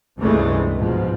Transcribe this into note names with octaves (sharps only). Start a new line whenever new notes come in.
C#2 G2 C3 E3 G#3 A3
G#2 B2 F3